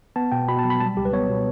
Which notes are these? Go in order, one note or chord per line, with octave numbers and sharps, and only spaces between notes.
B3 A5
B2 G5
B2 B5
A5
F#3
B5
G3 A5
C#2 G4
B4
B3 C#5
B2